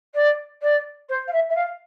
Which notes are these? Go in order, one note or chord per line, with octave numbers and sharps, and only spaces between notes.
D5
D5
C5
F5
E5
E5
F5